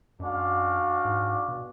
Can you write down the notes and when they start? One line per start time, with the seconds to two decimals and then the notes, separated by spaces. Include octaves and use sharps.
0.20 F#2 G#3 D4 F#4 D5 F5
1.05 G#2
1.48 B2